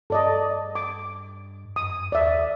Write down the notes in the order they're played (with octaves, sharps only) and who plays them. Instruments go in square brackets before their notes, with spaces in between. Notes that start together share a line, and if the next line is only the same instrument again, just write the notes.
[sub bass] G2 [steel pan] A4 D5 D#5
[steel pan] D6
[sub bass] F#2 [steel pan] D#6
[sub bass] D#2 [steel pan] D5 E5